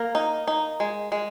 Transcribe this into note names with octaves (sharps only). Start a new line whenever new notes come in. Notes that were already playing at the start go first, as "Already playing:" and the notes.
Already playing: A#3 A#4
D#4
D#4
G#3
G#3